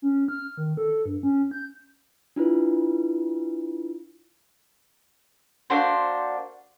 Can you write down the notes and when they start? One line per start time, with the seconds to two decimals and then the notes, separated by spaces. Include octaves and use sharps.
0.02 C#4
0.28 F6
0.57 D#3
0.77 A4
1.06 G2
1.23 C#4
1.51 G6
2.36 D4 E4 F4 B4
5.70 A#3 D4 F#4 C5